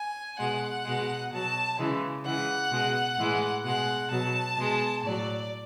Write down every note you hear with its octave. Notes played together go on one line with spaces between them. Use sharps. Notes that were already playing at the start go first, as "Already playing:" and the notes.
Already playing: G#5
B2 G#3 F#5
B2 G#3
B2 F#3 A5
C#3 E3 G#3
C#3 E3 G#3 F#5
B2 G#3
A2 E3 G#3
B2 G#3 F#5
B2 F#3 A5
B2 G#3
A2 F#3 D5